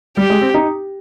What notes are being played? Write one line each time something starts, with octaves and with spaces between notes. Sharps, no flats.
G3 G4
G#3
C4
D#4